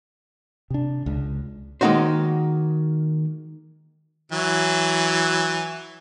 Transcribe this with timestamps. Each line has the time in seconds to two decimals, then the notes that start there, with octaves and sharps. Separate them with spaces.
0.70 C3 D4
1.06 C#2
1.81 D#3 G#3 A#3 D#4 F#4 C5
4.32 E3 F#3